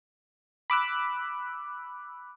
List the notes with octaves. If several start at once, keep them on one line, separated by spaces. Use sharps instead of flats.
B5 D6 E6 F#6